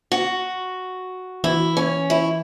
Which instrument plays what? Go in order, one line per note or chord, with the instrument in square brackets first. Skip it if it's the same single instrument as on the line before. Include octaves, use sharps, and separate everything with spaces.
[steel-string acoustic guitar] F#4
[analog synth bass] E3 [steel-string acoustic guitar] E4
[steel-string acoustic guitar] C#4
E4